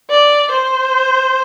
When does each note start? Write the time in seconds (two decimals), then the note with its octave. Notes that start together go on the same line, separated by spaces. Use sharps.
0.10 D5
0.51 C5